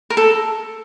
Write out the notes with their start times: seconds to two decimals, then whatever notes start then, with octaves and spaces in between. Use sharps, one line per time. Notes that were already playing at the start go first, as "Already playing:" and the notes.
0.10 A#4
0.17 A4